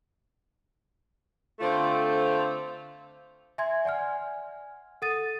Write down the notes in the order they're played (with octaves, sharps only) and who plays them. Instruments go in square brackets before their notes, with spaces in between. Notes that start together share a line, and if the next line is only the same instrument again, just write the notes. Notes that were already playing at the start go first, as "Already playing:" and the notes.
[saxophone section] D3 A3 C4 F4 C5
[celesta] E5 G#5 C6 G#6
D5 F#5 G#5 F6
A4 F#5 D#6 A6 D#7